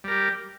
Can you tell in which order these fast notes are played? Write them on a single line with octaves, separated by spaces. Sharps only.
G3 A#4 G4